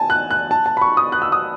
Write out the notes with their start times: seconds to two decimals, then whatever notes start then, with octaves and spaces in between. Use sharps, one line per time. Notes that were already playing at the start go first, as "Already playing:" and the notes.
Already playing: G#5 A5
0.10 F#6
0.31 F#6
0.51 A5
0.66 A5
0.77 B5
0.81 C#6
0.97 D#6
1.12 F#6
1.22 E6
1.32 D#6